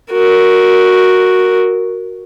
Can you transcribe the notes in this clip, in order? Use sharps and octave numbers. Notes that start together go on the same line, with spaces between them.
F#4 A#4